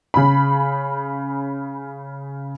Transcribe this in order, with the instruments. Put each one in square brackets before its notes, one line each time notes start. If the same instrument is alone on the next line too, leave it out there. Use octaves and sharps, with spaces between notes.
[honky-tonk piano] C#3 B5